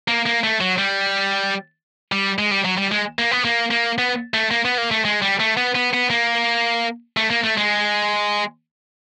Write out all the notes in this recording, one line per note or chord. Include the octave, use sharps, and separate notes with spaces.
A#3
A#3
A3
F#3
G3
G3
G#3
G3
F#3
G3
G#3
A#3
B3
A#3
A#3
B3
A3
A#3
B3
A#3
A3
G#3
G3
A3
B3
B3
B3
A#3
A3
A#3
A3
G#3